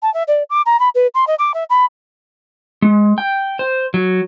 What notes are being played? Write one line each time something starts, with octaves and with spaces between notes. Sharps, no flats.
A5
E5
D5
D6
A#5
B5
B4
C6
D#5
D6
E5
B5
G#3
G5
C5
F#3